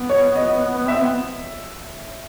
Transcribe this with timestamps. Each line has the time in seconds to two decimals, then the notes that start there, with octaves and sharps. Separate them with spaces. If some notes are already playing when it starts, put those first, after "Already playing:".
Already playing: B3
0.09 C#5
0.35 D#5
0.78 B3
0.87 C4 E5
1.01 B3